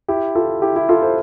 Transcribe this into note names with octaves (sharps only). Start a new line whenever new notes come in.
E4 G4
F4 A4
E4 G4
E4 G4
F4 A4
A4 C5